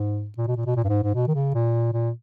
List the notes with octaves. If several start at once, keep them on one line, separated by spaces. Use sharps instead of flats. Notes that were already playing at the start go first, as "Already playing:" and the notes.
Already playing: G#2
A#2
B2
A#2
B2
A#2
G2
G#2
G#2
B2
D#3
C#3
A#2
A#2